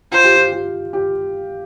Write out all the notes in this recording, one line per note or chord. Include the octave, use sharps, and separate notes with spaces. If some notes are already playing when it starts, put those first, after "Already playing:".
F4 C5
G4
F4
G4
G4